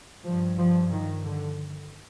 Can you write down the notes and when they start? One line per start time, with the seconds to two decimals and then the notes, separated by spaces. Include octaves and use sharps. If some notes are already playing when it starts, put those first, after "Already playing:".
0.24 G2 F3
0.58 F3
0.91 D#3
1.24 D3